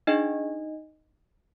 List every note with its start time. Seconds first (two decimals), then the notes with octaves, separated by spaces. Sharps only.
0.07 D4 D#4 G#4 D#5